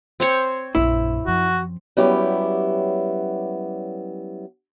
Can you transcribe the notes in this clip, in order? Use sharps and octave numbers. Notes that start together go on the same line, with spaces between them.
C4 C5 C#5
A#1 F#2 E4
F#2 F3 F#4
F#3 G3 B3 C#4 E4 G4